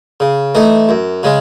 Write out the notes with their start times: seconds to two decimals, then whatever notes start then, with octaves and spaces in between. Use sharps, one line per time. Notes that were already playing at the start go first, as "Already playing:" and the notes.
0.20 C#3
0.55 E3 A3 D#4
0.89 F#2
1.23 C#3 G#3 C#4